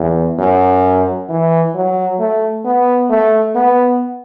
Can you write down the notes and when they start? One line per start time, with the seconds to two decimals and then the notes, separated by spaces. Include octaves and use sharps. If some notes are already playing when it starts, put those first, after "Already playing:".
Already playing: E2
0.39 F#2
1.29 E3
1.75 F#3
2.19 A3
2.65 B3
3.10 A3
3.55 B3